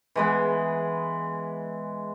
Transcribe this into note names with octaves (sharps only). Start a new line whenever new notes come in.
E3 G#3 B3